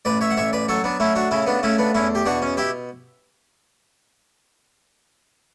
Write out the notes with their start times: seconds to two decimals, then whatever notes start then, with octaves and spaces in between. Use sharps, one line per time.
0.05 A1 B4 D5
0.21 C#5 E5
0.30 F#5
0.37 A1 C#5 E5
0.53 B4 D5
0.68 F#3 A4 C#5
0.84 B3 D4
1.00 A3 C#4 E4
1.16 D4 F#4
1.31 C#3 C#4 E4
1.47 B3 D4
1.63 A3 C#4 E4
1.78 B3 D4
1.95 E2 C#4 E4
2.15 G4
2.26 B2 D4 F#4
2.42 C#4
2.57 E4 G4